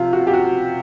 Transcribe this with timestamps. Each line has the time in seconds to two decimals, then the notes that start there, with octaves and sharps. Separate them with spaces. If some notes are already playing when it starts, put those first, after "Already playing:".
Already playing: C3 F3 F4
0.13 F#4
0.27 G4
0.34 F#4